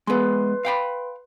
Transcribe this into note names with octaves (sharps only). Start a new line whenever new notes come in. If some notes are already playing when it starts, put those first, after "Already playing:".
G#3 B3 B4 C6
F5 G5 B5